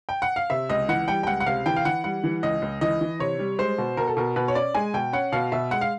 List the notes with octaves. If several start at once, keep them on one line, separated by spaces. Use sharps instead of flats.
G5
F#5
F5
C3 E5
C#2 D#5
E3 F#5
G3 G5
G5
C#2 F#5
F#5
C3 F5
E3 G5
F5
E3 F#5
G3 F#5
E3
C#2 D#5
C#2
E3 D#5
E3
C3 C#5
G3
G#3 C5
B2
B2 A#4
A4
B2 A#4
B2 B4
C#5
C#4 D5
G#3 G#5
B2 G5
C#4 F#5
B2 F5
B2 E5
G#3 F#5
F5